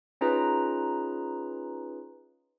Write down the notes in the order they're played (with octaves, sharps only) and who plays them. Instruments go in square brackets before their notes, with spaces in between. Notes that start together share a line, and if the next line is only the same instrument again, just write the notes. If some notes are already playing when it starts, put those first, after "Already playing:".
[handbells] C#4 D#4 F4 G#4 B4 A#5